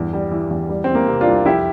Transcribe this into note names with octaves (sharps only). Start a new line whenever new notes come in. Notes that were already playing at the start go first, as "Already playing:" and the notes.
Already playing: E2 G2
G3
E3
E2
G3
E3 C4
A#3
C3
D4 F4
C2
F2 E4 G4